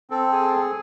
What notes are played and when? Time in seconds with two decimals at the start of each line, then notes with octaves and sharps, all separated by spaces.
0.10 C4 A4
0.32 G#4